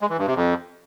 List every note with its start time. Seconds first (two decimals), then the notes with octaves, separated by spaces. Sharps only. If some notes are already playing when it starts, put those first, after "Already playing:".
0.01 G#3
0.10 E3
0.18 G2
0.27 C3
0.36 F2